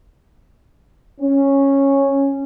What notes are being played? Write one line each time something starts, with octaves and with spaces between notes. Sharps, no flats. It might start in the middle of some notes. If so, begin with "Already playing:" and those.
C#4